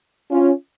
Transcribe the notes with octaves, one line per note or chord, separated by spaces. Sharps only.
C#4 F4